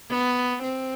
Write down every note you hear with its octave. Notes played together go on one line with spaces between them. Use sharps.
B3
C4